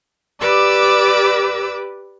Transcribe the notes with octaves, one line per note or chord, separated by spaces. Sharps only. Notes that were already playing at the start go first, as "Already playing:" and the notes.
G4 B4 D5 D6 E6